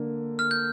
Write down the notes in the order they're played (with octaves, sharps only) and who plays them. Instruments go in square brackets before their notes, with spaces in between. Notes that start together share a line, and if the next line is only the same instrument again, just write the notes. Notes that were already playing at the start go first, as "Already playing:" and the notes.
Already playing: [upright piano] D3 A#3
[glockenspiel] F6
G6